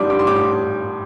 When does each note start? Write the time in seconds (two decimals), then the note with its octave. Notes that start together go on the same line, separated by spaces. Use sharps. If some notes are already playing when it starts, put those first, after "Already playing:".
Already playing: A2 G3 D4 C6 D6 D#6
0.10 D6
0.19 C6
0.27 A2 D6